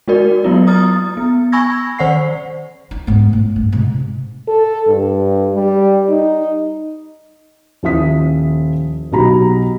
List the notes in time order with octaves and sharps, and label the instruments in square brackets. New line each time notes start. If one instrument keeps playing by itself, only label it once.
[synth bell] G#3 D#4 F#4 A#4 D5
F#3 A#3 B3 E4 F4
A#5 D#6 F6 A6
B3
G#5 B5 C#6 E6 G#6 A#6
D#3 C5 D5 F#5 C#6 C7
[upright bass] D#4
G#2 B3
A2
G2
G#2 C3
[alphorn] A4
G2
G3
D#4
[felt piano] D#1 F3 E4 E5 D#6 B6
B1 B2 G4 A#5 B5